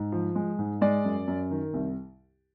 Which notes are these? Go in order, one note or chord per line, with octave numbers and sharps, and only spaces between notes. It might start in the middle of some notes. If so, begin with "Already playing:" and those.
Already playing: G#2
F3
G#3
G#2
G#3 D5
F#2
F#2
D#3
C2